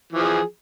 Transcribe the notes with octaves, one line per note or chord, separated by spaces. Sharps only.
E3 F3 G#4